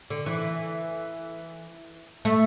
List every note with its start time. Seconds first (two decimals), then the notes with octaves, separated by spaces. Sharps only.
0.10 D3
0.26 E3
2.25 A3